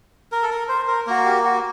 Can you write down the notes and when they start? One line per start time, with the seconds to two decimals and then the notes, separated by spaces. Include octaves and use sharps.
0.32 A#4
0.43 A4
0.50 A#4
0.68 C5
0.87 A#4
1.07 A#3 F#4 A#4
1.25 G4
1.44 F#4